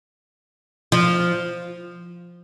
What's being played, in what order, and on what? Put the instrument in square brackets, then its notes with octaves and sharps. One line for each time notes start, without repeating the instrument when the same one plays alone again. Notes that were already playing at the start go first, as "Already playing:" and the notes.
[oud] F3